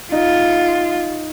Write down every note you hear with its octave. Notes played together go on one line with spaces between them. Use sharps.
D#4 F4